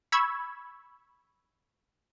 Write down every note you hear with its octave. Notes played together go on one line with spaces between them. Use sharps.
B5 C#6 E6 G#6